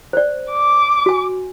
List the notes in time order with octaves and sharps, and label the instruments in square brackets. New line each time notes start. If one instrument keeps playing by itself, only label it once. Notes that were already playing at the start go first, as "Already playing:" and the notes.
[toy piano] C5 D5
[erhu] D6
[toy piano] F#4 G#5